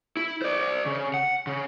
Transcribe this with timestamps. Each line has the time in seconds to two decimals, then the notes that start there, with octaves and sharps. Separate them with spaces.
0.17 E4
0.42 C5 D5
0.86 C#3
1.14 F#5
1.47 C#3